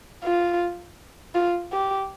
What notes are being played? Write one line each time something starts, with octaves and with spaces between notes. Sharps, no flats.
F4
F4
G4